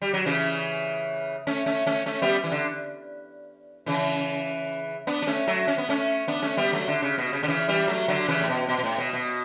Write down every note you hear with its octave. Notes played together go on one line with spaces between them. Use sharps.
G3
F#3
C#3 E3
A3 C#4
A3 C#4
A3 C#4
A3 C#4
G3 B3
E3
D3
C#3 E3
B3 D4
D4
A3 C#4
F#3 A3
C#4
B3
A3 C#4
B3 D4
A3 C#4
G3 B3
F#3 A3
D3
C#3
B2
C#3
D3
C#3 E3
E3 G3
F#3 A3
D3 F#3
C#3 E3
A2
B2
B2
B2
A2
B2
B2